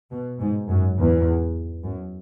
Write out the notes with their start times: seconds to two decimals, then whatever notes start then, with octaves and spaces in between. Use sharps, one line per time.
0.11 B2
0.40 G#2
0.68 F#2
0.98 E2
1.84 F#2